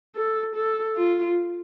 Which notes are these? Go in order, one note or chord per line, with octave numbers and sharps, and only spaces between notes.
A4
A4
F4